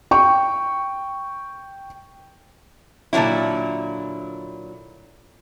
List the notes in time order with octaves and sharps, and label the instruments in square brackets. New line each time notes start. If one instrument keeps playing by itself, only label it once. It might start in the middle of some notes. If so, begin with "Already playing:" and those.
[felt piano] G5 C#6
[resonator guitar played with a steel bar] A#2 D3 D#3 F#3 E4